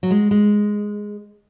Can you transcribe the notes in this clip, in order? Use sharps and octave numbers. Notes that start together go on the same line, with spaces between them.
F#3
G#3
G#3